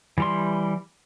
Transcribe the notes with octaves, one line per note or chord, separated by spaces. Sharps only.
E3 G3 C6